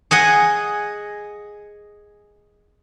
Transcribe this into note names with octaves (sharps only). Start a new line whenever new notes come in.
G#4 D#5 F#5 G#5